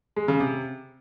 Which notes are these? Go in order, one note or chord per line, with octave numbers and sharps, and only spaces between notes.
G#3
C#3
C3